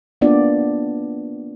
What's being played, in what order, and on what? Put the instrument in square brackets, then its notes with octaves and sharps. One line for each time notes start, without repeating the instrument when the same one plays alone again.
[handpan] A#3 B3 D4 F4 D5